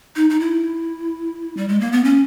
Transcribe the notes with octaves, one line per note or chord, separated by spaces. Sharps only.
D#4
D#4
E4
G3
G#3
A#3
B3
C#4